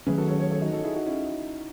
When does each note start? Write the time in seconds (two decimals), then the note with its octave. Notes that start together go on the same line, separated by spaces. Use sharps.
0.07 D#3 F#3 A3 C#4 G#4 B4
0.18 F#4 A4
0.28 A4 C#5
0.40 A4 C#5
0.51 A4 C#5
0.62 D#4 F#4
0.73 F#4 A4
0.84 E4 G#4
0.95 D#4 F#4
1.06 C#4 E4